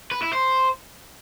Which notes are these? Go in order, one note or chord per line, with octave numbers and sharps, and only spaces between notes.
B4
E4
C5